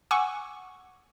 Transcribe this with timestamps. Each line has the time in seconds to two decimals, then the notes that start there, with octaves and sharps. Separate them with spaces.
0.11 F#5 G#5 C#6 D6 E6